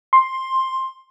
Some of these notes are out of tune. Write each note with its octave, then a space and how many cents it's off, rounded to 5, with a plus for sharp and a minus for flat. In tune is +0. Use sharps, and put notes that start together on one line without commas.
C6 +10